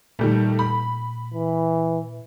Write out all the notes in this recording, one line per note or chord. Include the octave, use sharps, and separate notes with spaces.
A#2 D#3 G3 A3
B5
E3